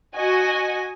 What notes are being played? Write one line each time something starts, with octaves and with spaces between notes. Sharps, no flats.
F#4 D#5 G#5